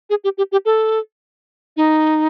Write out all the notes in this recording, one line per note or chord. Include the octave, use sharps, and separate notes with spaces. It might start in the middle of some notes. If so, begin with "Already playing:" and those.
G#4
G4
G4
G4
A4
D#4